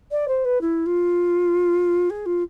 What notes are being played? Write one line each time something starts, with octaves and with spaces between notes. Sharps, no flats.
D5
C5
B4
E4
F4
G#4
F4